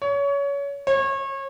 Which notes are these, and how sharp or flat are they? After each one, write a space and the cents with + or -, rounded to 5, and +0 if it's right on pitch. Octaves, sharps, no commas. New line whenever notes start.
C#5 +25
C#5 -30